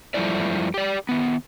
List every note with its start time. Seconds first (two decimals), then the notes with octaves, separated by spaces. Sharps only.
0.14 F#2 F3 G3 A3 E4 D5
0.74 G4 D5
1.09 D#3 B3